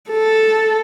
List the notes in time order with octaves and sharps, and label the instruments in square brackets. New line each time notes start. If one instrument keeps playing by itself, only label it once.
[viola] A4